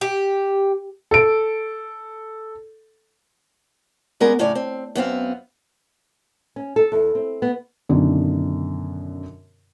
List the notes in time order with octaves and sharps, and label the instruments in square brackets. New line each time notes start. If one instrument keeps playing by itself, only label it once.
[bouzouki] G4
[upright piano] A4 D7
[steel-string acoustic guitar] G3 G#3 B3 C#4 G#4 A#4
F#2 A2 C#3 C#5 D5
C4
F#2 B3 C4 F5
[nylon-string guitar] C#4
A4
E2
C4
B3
[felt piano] F#2 B2 D3 D#3